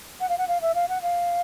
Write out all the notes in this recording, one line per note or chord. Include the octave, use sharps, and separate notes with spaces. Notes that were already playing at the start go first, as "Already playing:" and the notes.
F#5
F5
F#5
F5
E5
F5
F#5
F5